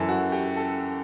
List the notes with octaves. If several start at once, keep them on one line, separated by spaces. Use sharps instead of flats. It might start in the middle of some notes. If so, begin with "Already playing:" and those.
Already playing: F#2 E3 A4
F#4
G4
A4